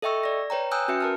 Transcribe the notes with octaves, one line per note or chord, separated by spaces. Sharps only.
A4 D#5 E5 G5 C#6 E6
D5 A#6
B4 C#5 G5 A#5
G5 G#5 D#6 E6 F#6 G6
C#4 F#4 B4 E5 C#7
A#4 A5 F6